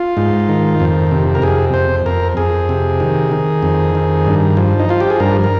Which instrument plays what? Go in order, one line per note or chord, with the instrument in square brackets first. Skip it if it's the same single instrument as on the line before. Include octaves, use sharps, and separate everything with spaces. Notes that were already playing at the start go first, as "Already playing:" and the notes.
Already playing: [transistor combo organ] F4
G#2
D#3
F2
C3
A#4
F2 G#4
F2 C5
F2 A#4
F2 G#4
C3
D#3
D#3
F2
D#3
G2
F3
D#4
F3 F4
G4
G#4
G2 A#4
A#4